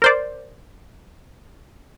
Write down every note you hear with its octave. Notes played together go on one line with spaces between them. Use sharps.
A#4 C5 D5